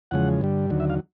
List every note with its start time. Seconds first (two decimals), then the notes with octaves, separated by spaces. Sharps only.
0.11 E2 C#3 F3 G#3 F#5
0.41 G2 D3 G3
0.70 D#2 D3 F#3
0.80 E5
0.90 F5